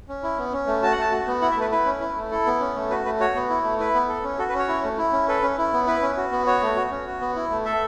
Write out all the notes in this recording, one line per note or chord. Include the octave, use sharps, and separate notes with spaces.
C#4
E4
B3
C#4
A3
F#4 A5
F#5
A3 A5
F#4
B3
E4 F#5
E5
A3
B4
E4 B4
C#4
E4
A3
E4 A4
B3
C#4
A3
F#4 B4
A3 B4
F#4 C#5
B3
E4
A3
E4 B4
B3
A4
C#4
F#4 A4
B4
C#4 C#5
E4
A3
E4
C#4
A4 B4
C#4
E4
B3
E4 B4
C#4
F#4
B3
F#4 C#5
A3
F#4
C#4
F#4
B3
E4
A3
A4 E5